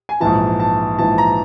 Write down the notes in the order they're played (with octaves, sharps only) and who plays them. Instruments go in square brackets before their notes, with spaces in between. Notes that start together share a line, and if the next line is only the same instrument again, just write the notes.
[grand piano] G#5
A#1 G#2 E3 A5
A5
A#1 G#2 E3 A5
A#5